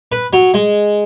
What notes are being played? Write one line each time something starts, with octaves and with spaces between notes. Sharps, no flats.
B4
F#3
G#3